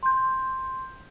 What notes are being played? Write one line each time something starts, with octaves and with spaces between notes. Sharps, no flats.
C6 G6